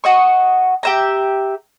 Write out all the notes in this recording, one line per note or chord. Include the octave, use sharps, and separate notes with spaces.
F#4 D#5 C#6
G4 E5 A#5